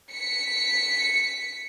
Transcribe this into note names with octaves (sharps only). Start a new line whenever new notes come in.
B6 C#7